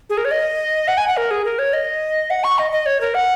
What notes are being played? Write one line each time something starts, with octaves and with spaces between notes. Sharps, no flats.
G#4
A#4
C#5
D#5
F#5
G#5
F#5
A#4
G#4
A#4
C#5
D#5
F#5
C#6
D#5
D#5
C#5
A#4
F#5